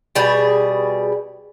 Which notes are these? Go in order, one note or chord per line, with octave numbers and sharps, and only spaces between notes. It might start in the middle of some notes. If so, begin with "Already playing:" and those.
B2 G3 G#4